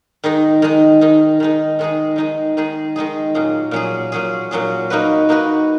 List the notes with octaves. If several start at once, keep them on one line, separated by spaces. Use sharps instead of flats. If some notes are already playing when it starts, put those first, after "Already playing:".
D#3 G#3 D#4
D#3 G#3 D#4
D#3 G#3 D#4
D#3 G#3 D#4
D#3 G#3 D#4 G#4
D#3 G#3 D#4 G#4
D#3 G#3 D#4 G#4
D#3 G#3 D#4 G#4
A#2 F#3 C#4 G#4
A#2 F#3 C#4 G#4
A#2 F#3 C#4 G#4
A#2 F#3 C#4 G#4
A#3 D#4 F#4 B4
A#3 D#4 F#4 B4